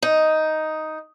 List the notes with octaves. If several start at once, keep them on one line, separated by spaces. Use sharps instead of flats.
D#4